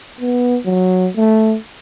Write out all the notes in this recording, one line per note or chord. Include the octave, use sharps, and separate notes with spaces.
B3
F#3
A3